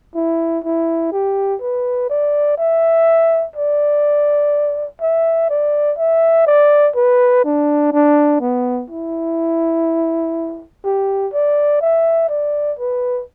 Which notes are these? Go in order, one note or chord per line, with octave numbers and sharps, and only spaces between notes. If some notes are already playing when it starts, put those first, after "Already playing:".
E4
E4
G4
B4
D5
E5
D5
E5
D5
E5
D5
B4
D4
D4
B3
E4
G4
D5
E5
D5
B4